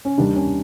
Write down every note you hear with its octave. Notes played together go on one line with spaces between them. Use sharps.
C#4
D#2 D#3 G3 D4
C#4